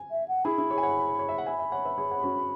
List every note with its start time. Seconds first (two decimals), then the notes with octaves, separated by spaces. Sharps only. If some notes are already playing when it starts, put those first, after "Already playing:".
Already playing: G#5
0.11 E5
0.28 F#5
0.45 E4 G#4 B5
0.58 E4
0.71 G#4 C#5
0.78 G#5
0.83 C#5 F#5
1.19 C#5
1.29 E5
1.38 F#5
1.46 E5 G#5 B5
1.59 E5 G#5
1.72 C#5 F#5
1.85 B4 E5
1.98 G#4 C#5
2.11 C#5 F#5
2.19 G#4
2.23 C#4 F#4
2.36 C#4